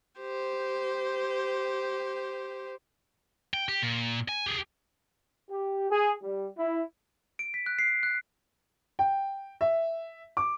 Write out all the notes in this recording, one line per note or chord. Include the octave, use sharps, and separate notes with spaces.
G4 C5
G5
G4
A#2
G#5
G4 G#4
G4
G#4
G3
E4
D7
B6
F#6
C7
F#6
G5
E5
D6